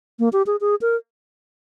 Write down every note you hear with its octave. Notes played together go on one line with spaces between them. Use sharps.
A#3
G4
G#4
G#4
A#4